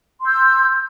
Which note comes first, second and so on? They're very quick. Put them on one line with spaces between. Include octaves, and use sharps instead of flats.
C6 E6 G6